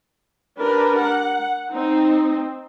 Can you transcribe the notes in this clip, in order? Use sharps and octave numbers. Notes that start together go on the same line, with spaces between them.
D4 G4 A#4 B4
F#5
C4 D#4